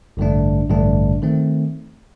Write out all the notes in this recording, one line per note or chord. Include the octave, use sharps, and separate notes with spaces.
A1 G2 D3 A3 D4
A1 G2 D3 A3 D4
D#3 A3 C4